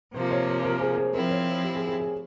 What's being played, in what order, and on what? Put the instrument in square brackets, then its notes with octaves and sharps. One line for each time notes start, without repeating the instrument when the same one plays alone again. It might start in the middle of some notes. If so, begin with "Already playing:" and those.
[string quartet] C3 F3 A#3 [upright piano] C5
[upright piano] C#5
C5
A#4
G#4
G#4
[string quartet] F3 C4 E4 [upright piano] A#4
[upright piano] C#5
G4
G#4
G#4
G#4